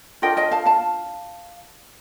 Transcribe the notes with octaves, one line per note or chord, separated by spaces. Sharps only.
D4 F4 A#4 D#5 G5
D#5 G5
F5 A5
F5 A5